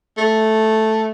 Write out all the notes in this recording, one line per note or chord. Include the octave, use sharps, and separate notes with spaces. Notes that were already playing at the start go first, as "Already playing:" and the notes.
A3